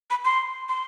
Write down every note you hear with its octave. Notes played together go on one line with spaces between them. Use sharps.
B5
C6
C6